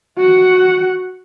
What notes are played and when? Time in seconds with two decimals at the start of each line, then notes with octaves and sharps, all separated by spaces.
0.17 F#4 F#5